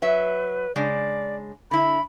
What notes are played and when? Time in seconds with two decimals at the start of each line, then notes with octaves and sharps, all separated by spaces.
0.02 F#3 B4 E5
0.76 C#3 G#3 D4 D5
1.71 D3 E4 B5